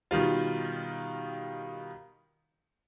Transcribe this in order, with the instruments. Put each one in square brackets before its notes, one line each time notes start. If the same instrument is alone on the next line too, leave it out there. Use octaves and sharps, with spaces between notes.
[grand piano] B2 D#3 G3 F4